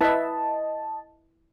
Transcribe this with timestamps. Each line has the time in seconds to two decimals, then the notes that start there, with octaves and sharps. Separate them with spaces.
0.01 E4 B4 D#5 E5 A5